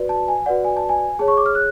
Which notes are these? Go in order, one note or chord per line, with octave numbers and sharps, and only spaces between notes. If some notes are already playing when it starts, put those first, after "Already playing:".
Already playing: F#4 B4 D5
A5
G#5
F#4 B4 D5 F#5
G#5
A5
G#5
G#4 C#5 A5
C#6
D6
F6
F#6